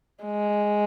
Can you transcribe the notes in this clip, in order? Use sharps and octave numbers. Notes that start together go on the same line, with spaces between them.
G#3